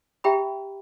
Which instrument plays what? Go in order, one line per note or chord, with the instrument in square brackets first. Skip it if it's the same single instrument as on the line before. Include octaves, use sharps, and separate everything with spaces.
[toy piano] G4 E5 G5 A#5 B5